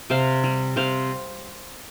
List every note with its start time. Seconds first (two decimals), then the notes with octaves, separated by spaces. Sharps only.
0.10 C3 C5 F5
0.44 G3
0.76 C3 C5 F5